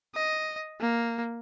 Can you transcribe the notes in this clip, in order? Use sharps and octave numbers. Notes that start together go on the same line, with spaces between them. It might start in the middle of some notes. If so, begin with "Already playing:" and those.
D#5
A#3